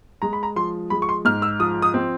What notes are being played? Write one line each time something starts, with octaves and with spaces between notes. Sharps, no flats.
G#3 A#5
B5
A#5
F3 C6
G#3 B5
C#6
C6
G#2 F6
E6
F3 D#6
D#6
C4